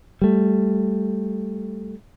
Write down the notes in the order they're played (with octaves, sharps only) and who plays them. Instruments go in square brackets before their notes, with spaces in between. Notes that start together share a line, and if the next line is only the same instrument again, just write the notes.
[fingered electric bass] G3 A3